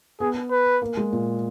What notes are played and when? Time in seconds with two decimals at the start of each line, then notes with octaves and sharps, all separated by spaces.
0.20 B3 G#4
0.51 B4
0.82 A#3
0.97 G#3
1.13 A#2